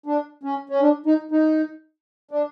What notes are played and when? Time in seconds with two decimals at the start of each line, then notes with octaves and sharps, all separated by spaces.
0.06 D4
0.43 C#4
0.69 C#4
0.81 D4
1.06 D#4
1.31 D#4
2.31 D4